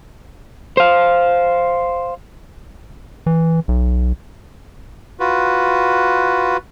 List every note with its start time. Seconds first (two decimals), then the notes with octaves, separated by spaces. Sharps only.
0.77 C5 F5
3.26 E3
3.68 B1
5.20 F4 F#4 B4